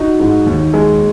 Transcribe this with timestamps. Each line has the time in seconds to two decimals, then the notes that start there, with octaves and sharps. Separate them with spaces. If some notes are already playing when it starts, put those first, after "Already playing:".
Already playing: D#4 F#4
0.20 G#2
0.46 D#2
0.73 G#3